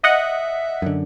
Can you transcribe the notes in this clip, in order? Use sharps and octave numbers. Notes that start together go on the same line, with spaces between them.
D#5 E5 F#5
F#2 D3